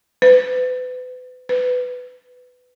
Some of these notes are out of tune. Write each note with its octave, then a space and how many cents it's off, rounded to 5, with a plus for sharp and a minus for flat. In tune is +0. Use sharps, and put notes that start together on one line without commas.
B4 +35
B4 +15